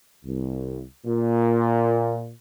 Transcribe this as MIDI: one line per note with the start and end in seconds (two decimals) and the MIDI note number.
0.25 0.81 36
1.06 2.30 46